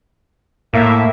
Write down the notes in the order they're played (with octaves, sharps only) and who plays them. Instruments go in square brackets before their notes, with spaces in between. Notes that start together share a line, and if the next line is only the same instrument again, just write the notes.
[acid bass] A2 [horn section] A#3 E5